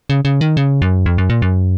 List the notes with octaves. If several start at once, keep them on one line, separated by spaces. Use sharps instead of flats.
C#3
C#3
D#3
C#3
F#2
F2
F#2
A#2
F#2